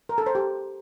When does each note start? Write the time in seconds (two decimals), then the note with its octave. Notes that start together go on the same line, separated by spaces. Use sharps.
0.09 A#4
0.18 A4
0.26 C5
0.35 G4